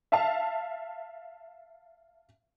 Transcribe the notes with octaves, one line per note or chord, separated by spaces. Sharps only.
E5 F5 A5